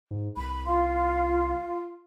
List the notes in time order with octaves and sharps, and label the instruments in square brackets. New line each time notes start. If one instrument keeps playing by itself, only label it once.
[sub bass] G#2
[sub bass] C2 [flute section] B5
[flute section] F4 F5 C6